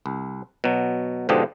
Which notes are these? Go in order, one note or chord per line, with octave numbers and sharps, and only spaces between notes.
C2
B2 F#3
G#2 B2 D3 F3 G4 D#5